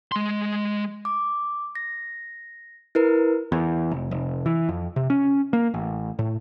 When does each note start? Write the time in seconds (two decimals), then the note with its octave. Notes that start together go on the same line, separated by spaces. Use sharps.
0.12 G#3 C6
1.05 D6
1.75 A#6
2.95 E4 A#4 B4
3.52 E2
3.91 F1
4.11 F1
4.46 E3
4.69 F2
4.96 C3
5.10 C#4
5.53 A#3
5.74 A1
6.19 A2